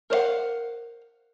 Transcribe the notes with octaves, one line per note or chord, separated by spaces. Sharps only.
A#4 C5 C#5 F5 F#5